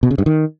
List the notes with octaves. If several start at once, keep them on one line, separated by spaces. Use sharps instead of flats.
B2
C#3
G2
D#3